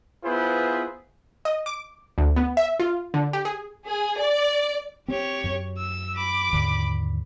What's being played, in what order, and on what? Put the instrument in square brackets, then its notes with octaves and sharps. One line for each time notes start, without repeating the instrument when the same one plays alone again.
[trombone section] B3 E4 F4 G#4 B4 C5
[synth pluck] D#5
D6
D2
B3
E5
F4
D3
G4
G#4
[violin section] G#4
D5
[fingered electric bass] C4 [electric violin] G4 C#5
[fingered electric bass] F#2
[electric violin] E6
B5 D6
[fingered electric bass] D#2 G#2 D3